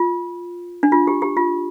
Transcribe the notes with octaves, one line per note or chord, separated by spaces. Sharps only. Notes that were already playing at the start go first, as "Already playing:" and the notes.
Already playing: F4
D4
F4
G4
G4
F4